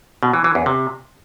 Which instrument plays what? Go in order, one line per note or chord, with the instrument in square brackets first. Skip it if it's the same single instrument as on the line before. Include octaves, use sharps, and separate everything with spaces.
[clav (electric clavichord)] B2
E3
E3
E2
C3